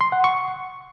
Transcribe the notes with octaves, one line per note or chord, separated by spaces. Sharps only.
C6
F#5
C#6